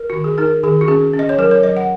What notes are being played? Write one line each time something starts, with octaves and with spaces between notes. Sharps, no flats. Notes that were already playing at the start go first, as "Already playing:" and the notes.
Already playing: A#4
D#3 F#4
G#4
D#4 A#4
D#3 G#4
F#4
C#4 G#4
C#4
D#5
C#5
F#3 A#4
C#5
F#3 D#5
F#5